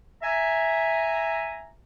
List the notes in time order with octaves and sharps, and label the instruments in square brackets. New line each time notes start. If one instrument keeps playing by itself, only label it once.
[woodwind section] E5 G#5 A#5